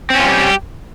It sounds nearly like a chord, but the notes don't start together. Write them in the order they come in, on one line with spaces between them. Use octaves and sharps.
C4 C#4 F4 G3 G4